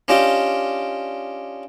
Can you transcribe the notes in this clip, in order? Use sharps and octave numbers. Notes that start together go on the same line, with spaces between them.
C#4 D4 F4 G4 D#5 G5